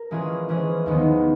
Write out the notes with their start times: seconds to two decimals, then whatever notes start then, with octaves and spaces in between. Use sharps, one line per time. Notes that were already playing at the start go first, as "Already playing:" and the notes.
Already playing: A#4
0.11 E3 G#3 C#4 F4 G#4
0.49 E3 G#3 C#4 F4 G#4
0.86 D#2 D#3 G#3 B3